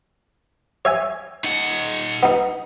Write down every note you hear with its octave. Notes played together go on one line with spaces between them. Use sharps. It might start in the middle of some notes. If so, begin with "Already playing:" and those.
C#5 E5 G#5
D#4 F#5
B3 D#4